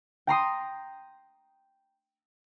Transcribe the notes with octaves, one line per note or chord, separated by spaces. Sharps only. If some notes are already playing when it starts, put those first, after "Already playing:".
G5 A#5 C6 D#6